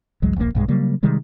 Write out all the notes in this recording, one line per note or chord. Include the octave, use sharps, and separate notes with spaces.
A1 D2 F#3 G#3
D#1 A#1 A2 A#3
B1 G2 G#3
C#3 F#3 G3 A#3
C3 D#3 G3 G#3